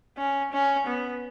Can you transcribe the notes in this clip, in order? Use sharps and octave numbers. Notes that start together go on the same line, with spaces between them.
C#4
C#4
B3